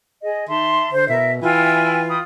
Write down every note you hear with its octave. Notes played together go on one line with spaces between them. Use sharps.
G#4 D#5
D#3 E5 A5 C6
D3 C5
B2 E4 A#4 E5
E3 E4 F4 G5 G#5
G5 B5 D#6